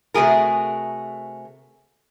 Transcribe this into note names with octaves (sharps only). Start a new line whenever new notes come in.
C3 A3 F#4 G#4 A#4